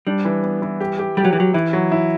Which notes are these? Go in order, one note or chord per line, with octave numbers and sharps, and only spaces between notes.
G3 D4
E3
B3
E3
G4
G4
G3 G4
F#3
E3
F#3 G4
E3 E4
F#3
E4